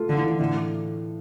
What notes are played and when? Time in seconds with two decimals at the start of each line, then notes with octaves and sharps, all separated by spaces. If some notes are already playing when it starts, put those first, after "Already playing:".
Already playing: A3 F4
0.10 D3
0.17 E3
0.39 A2 D3